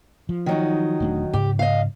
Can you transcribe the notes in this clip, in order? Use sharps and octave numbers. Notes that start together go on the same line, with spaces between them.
F3
D#3 F#3 D#4
E1 A3 D4
G#2 C#3 G4
D#5 F5